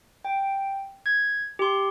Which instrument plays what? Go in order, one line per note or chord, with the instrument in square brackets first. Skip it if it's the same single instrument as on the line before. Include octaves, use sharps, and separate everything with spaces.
[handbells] G5
G#6
G4 C6